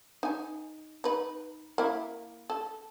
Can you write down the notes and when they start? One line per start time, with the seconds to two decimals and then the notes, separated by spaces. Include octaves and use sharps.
0.23 D#4 G#5
1.04 D#4 B4
1.78 A#3 E4
2.50 A4